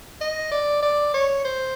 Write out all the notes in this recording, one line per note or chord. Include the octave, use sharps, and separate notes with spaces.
D#5
D5
D5
C#5
C5